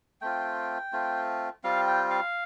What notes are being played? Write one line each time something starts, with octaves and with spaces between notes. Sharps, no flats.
A3 C4 F4 G5
A3 C4 F4
G3 C4 F4 F5
G5
F5